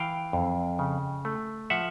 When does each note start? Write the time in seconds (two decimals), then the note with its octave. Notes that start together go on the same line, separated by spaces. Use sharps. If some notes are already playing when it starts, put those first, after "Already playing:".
Already playing: E3 F5 G5
0.33 F2
0.79 C#3
1.25 A3
1.70 F3 E5 F#5